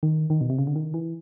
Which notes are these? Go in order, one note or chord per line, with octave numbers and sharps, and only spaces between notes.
D#3
D#3
B2
C3
C#3
D3
D#3
E3